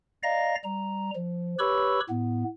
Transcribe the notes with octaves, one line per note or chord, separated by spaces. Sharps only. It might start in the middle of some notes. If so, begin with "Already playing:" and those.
D5 D#5 F5 A#5 A#6
G3 A#5
F3
G4 B4 C#5 B5 C#6 E6
A2 B3